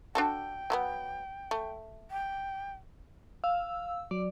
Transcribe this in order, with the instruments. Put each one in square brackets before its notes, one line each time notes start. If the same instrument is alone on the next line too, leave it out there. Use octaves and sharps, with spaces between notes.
[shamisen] D4 F#4 A4 [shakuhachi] G5
[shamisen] F#3 A3 B3
A3
[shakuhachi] G5
[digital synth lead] F5 [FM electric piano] E6
[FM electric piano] F#3 [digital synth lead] D5